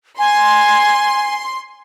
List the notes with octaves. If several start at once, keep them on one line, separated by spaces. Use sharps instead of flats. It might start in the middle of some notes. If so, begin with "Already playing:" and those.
G#5 C6